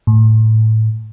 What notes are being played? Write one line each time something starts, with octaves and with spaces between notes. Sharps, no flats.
A2